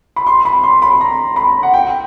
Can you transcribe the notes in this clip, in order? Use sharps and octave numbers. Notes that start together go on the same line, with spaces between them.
B5
C6
B5
C6
B5
A#5
B5
F#5
G5